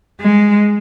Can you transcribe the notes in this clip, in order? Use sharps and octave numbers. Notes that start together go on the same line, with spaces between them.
G#3